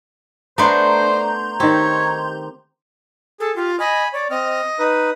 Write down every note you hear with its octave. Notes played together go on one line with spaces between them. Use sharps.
A3 B3 D4 C5 A#5 C6 G6
D#3 C4 G4 C#5
G#4 A4
F4 G4
D#5 G#5 B5
C#5 D5
C4 D#5 F6
D#4 B4 D#6